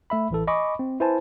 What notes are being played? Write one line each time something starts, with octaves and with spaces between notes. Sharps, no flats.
A3 E5 B5
A1 E3 A4
D#5 G#5 B5 C#6 D6
C4
E4 B4 C5 G#5 A5